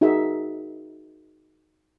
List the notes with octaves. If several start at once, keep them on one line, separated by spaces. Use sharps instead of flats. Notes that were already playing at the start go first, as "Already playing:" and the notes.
D#4 F#4 G#4 A#4 E5